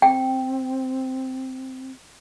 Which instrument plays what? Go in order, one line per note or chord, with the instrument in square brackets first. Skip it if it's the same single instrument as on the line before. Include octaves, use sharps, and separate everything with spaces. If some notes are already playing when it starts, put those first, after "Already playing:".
[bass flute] C4 [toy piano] G5